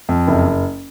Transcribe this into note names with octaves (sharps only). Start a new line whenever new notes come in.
F2
F#1